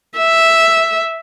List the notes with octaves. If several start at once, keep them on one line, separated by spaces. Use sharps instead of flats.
E5